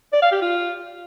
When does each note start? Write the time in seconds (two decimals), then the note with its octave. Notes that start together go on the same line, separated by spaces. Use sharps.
0.13 D5
0.22 F5
0.32 G4
0.42 F4